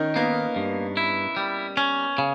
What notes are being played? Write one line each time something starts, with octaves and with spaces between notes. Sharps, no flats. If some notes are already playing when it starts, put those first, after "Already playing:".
Already playing: D#3 C#4 D#4 A#4
A#3 B3
G2
E4
G3
C#4
C#3